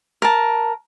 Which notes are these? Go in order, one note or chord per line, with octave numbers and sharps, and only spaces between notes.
A#4 A5